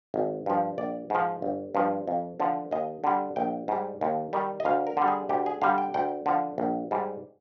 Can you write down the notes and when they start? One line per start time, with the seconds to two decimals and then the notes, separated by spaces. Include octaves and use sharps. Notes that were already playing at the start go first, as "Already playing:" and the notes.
0.14 G#1
0.46 G2 F3
0.78 A#1 D5
1.10 G#2 F3
1.42 G1
1.75 G2 F3
2.07 F2
2.40 D3 F3
2.71 D#2 D#5
3.04 D3 G3
3.36 A#1 G5
3.68 G#2 G3
4.01 D#2
4.33 D#3 G3
4.60 D#5
4.65 D2 F5
4.87 A#4
4.97 D3 G3
5.08 G#4
5.29 D2 G4
5.46 G#4
5.62 D3 G3 F5
5.78 G5
5.94 D2 G5
6.26 D3 F3
6.58 A#1
6.91 G#2 G3